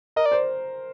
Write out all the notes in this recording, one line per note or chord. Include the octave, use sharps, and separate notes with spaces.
A#4 D#5
D5
C5